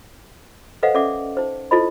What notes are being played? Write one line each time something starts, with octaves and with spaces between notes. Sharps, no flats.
A4 B4 C5 D#5 F5 F#5
C#4 A4 D5 E5 F#5 D6
D#4 C5
E4 F4 A4 C5 D#5 B5